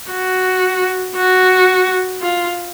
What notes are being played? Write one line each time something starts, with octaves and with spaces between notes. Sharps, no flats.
F#4
F#4
F4